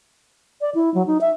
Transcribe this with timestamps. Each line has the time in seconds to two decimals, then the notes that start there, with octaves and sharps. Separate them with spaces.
0.61 D5
0.75 E4
0.94 F#3
1.07 D#4
1.21 E5